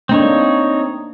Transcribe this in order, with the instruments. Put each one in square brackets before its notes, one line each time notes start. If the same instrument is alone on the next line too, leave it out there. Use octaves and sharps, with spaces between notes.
[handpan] A3 A#3 D4 [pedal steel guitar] C4 D#4 C#5